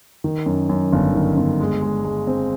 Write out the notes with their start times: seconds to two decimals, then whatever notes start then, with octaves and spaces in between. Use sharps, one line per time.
0.24 D#3
0.46 F#2
0.69 F#2
0.92 G1
1.15 D#3
1.37 G1
1.60 G#3
1.83 G#3
2.04 G#3
2.27 C4